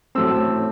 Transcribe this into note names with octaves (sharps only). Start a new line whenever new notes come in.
A2 F#3 A3 C4 E6